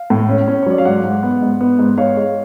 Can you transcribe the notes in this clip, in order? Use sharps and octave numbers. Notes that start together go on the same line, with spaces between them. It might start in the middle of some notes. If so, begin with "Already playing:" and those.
Already playing: F5
A2
C#4
C#4
C#5
F#3 D5
F5
G#2 D5 F#5
G#2
B3
G#2
B3
G#2
G#2 C#5 F5
G#3